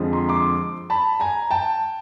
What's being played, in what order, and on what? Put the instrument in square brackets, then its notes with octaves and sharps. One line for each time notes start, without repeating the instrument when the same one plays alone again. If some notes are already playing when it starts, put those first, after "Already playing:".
Already playing: [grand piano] F2 D3 F3 G#3
A#5 C6
C6 D6
A5 B5
G#5 A#5
G5 A5